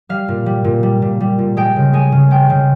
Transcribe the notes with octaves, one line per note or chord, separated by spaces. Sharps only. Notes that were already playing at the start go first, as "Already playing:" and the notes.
G3 F5
A#2
G3
A#2
G3
A#2
G3
A#2
G#3 G5
C#3
G#3 G#5
C#3
G#3 G5
C#3